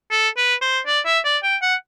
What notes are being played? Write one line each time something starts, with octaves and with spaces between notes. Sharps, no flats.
A4
B4
C5
D5
E5
D5
G5
F#5